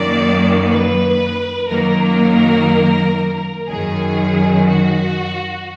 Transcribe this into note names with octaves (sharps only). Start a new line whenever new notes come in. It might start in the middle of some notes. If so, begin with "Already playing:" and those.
Already playing: F#2 D#3 F#3 A#3 D5
B4
F#2 D#3 F#3 A#3 A#4
F#2 D#3 F#3 G#4
F#4